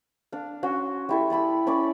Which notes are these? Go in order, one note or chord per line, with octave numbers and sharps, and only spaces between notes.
D4 F5
C#4 F#4 C6
G3 E4 A4
D5 A5 B5 E6
C#4 D5 B5 D6